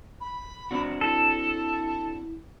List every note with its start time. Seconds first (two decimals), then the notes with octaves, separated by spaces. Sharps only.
0.21 B5
0.71 C4 D4 F#4
1.01 E4 A4